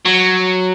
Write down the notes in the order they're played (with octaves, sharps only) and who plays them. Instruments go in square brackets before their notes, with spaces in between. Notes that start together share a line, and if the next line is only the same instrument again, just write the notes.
[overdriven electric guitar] F#3